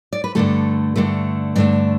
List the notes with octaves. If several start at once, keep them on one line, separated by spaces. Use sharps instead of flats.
D5
B4
G2 D3 A3 A4
G2 D3 A3
G2 D3 A3 D5